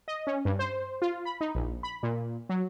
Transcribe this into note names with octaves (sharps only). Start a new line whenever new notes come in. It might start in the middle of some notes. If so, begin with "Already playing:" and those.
D#5
C#4
G2
C5
F4
B5
D#4
A#1
B5
A#2
F#3